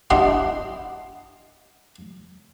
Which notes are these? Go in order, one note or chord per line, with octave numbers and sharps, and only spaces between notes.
D4 E4 G4 D#5 F#5 C6